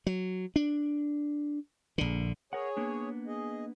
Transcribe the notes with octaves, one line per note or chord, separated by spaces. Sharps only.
F#3
D4
A#1 D3
G#4 A#4 C#5 F#5
A#3 B3 D4
G#4 D#5